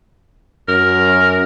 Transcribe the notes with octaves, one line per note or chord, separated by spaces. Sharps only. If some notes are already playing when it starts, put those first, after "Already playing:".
F#2 A#4